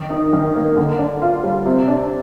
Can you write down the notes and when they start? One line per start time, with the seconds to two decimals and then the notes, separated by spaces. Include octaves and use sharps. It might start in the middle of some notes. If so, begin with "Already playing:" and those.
Already playing: D#3
0.10 D#4
0.33 D#3
0.55 A#3
0.76 D3
0.99 D4
1.22 F4
1.44 G3
1.66 C3
1.88 D4